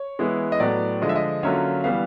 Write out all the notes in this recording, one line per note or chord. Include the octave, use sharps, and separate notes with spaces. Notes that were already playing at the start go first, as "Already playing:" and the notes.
Already playing: C#5
E3 G#3 B3 E4
D#5
A2 F#3 B3 D5
D3 F3 G#3 D#5
E5
D#5
D3 F#3 A#3 C#4 F4 E5
E3 G3 B3 F5